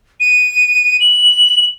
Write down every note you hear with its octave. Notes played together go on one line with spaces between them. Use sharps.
D#7
F#7